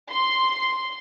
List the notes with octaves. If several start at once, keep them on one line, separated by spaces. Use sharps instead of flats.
C6